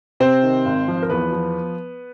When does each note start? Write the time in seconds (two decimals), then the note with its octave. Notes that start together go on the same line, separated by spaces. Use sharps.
0.20 C3 C4 C5
0.43 D#3
0.65 G#1
0.88 F3
1.03 A#4
1.10 E2 B3 B4
1.32 F3